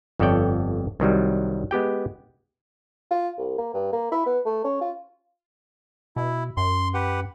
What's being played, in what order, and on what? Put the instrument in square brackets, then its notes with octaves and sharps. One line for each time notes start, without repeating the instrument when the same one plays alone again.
[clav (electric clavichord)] G1 F2 A4 C#5 D5 G5
C2 D#3 F#3 G3
G#3 B3 G4 G5
[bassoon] F4
C2
A#3
G2
A#3
E4
B3
A3
C#4
F4
[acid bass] B2 [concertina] E4
[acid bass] F#2 [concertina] C6
[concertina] G4 B4 F#5